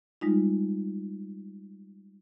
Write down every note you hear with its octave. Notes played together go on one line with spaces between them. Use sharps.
G3 G#3 D#4 F4